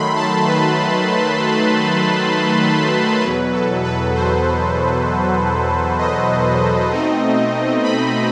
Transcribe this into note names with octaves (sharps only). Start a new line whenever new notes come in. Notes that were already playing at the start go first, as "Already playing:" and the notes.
Already playing: D#3 F#3 A3 B5 C6
A5
B4
E2 B2 F#3 B4
A4
B4
C5
D#5
B2 A3 C4 D#4
B5